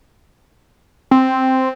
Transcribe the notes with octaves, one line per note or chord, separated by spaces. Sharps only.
C4